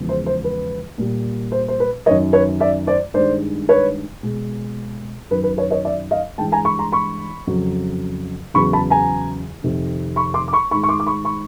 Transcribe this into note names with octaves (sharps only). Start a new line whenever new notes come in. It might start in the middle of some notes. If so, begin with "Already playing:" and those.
Already playing: E2 C#3 F3 G#3
C5
C5
B4
A#2 G3
C5
C5
B4
F#2 D#3 F#3 C#5 D#5
B4 C#5
D5 E5
C5 D5
G2 D#3 G#3 C5 D5
B4 C#5
B2 G#3
F#2 D#3 F#3 B4
B4
B4 C#5
C#5 D#5
D5 E5
D#5 F5
G2 E3 G#3 G5 A5
G#5 A#5
B5 C#6
A#5 C6
B5 C#6
F2 C#3 F#3
E2 C#3 F#3 B5 C#6
A5 B5
G#5 A#5
F2 C3 D#3
B5 C#6
C6 D6
D6
B5 C#6
G#2 D#3 G#3 B5 C#6
C#6
C6 D6
D6
B5 C#6
B5 C#6